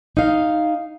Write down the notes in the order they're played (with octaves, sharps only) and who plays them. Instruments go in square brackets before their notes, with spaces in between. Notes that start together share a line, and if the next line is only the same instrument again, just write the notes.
[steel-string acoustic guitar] D#4 F5